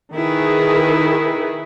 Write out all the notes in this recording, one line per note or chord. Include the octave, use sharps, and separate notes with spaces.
D#3 E4 G#4 B4